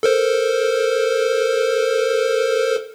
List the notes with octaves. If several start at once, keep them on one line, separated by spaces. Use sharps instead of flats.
A4 A#4 C5